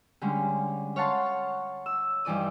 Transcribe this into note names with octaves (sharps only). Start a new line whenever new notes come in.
D3 G3 G#3 C#4
C#5 F5 F#5 A5 C6 C#6
E6
G2 D#3 E3 D5 D#6